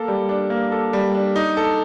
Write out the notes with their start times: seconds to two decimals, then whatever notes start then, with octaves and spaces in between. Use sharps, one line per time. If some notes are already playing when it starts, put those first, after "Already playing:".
Already playing: A#3 A4
0.08 G3
0.29 D4
0.50 A#3
0.72 A4
0.93 G3
1.15 D4
1.36 D#4
1.57 A4